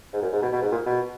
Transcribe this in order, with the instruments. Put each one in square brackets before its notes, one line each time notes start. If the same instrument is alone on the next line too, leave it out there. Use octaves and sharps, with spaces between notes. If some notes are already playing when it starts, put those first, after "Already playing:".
[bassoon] G#2
F#2
G#2
B2
B2
G#2
A#2
B2